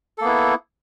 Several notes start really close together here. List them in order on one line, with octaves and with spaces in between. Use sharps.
A4 A#3 B3 E4